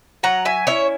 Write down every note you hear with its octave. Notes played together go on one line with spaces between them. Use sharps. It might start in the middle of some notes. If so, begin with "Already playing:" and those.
F#3 F#5 A#5
E5 G#5
C#4 E4 C#5 E5